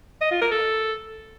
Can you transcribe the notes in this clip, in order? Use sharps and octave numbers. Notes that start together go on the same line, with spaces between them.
D#5
F4
A#4
A4